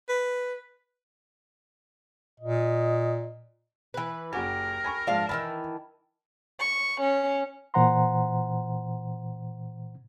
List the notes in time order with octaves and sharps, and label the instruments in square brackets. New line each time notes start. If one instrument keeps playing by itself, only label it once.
[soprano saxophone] B4
[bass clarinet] A#2 [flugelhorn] D#5
[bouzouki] E3 B4
[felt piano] F#1 F#4 G#5 [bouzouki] G4 [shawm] A#4
[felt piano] G#5 B5 C#6
[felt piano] G#2 F3 [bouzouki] D4 F5 A5
[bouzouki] D#3 E3 A5 [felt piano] B5 F6
[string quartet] C#6
C#4
[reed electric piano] A#2 E3 C5 F#5 A#5 C6